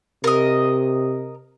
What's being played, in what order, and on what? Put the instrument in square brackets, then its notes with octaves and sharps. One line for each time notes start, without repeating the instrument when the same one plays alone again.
[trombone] C3 [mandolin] A#4 D#5